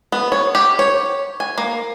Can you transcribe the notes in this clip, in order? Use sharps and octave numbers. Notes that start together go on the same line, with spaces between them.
B3
C#5
G4
C#5
G#5
A#3